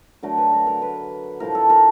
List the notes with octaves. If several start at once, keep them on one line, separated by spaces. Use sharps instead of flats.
D3 F#3 A3 A#4
B4
A#4
A#4
B4
A2 F3 A3 A#4
A4
A#4